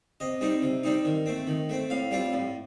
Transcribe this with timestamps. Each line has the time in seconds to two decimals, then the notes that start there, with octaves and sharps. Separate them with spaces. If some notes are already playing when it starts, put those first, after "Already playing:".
0.20 C3 D#5
0.41 G3 C4 D#4
0.62 C3
0.84 G3 C4 D#4
1.05 D#3
1.26 A3 C4
1.47 D#3
1.69 A3 C4
1.90 A2 F5
2.11 G3 C4 F4
2.33 A2